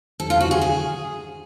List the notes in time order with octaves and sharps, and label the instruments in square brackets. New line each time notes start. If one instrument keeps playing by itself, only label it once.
[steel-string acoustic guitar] A4
F4
F#4
G#4
G#4